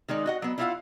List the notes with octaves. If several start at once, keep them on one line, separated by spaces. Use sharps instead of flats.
D#3 G#3 D#4 D5
F#4 D#5 F#5
F#3 B3
D4 E4 F4 D#5 F5 F#5